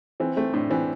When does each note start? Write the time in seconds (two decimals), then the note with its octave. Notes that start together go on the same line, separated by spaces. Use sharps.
0.20 E3 C4
0.36 A3 C4
0.53 A2 D4
0.70 E3 C4